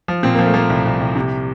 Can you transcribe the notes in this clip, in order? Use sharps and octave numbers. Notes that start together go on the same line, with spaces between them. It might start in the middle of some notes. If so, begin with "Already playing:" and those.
F3
A#2 C4
F3 A#3
A3
F3 A#3
C2
C2
C2
C3